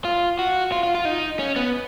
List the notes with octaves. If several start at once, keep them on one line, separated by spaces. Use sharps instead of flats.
F4
F#4
F4
F4
F4
D#4
C#4
B3